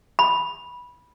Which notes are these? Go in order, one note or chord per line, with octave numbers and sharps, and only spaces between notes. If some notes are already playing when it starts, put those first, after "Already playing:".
B5